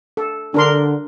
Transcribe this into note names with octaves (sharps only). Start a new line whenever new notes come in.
A4
D3 D4 A#4 C6